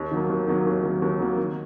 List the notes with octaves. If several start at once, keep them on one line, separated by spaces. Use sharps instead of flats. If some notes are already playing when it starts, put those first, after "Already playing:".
Already playing: D#2
D#3 F#3 A#3
D#2
D#3 F#3 A#3
D#2
D#3 F#3 A#3
D#2
D#3 F#3 A#3
D#3